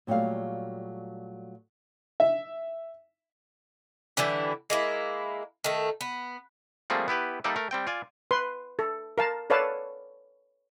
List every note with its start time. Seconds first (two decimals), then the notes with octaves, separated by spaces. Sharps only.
0.07 A#2 F#3 G3 A3 F5
2.20 E5
4.17 D3 E3 G3 E4
4.70 G#3 A#3 E4
5.64 D#3 A3
6.01 B3
6.90 F3 G3 A3 A#3 C4 G#4
7.08 B3 E4 G4 B4
7.44 G3 A#3 D#4 A4 D5 E5
7.56 A3 A#4
7.71 G3 C4 G5
7.87 F4 D5 G#5
8.31 B4 C6
8.79 A4
9.18 A#4 F5 A5
9.50 A4 B4 C#5 D5 F5 A5